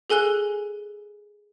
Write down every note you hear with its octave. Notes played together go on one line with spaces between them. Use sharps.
G#4 A4 G#5 F#6 G7